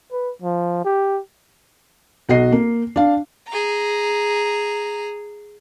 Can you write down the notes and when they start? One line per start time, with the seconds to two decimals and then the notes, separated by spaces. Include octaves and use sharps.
0.12 B4
0.42 F3
0.85 G4
2.29 B1 F#4 D#5 C7
2.52 A#3
2.96 D4 F5
3.48 G#4 A#5